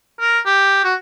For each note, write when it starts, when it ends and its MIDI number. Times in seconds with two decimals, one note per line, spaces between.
0.20 0.39 70
0.46 0.82 67
0.84 0.94 66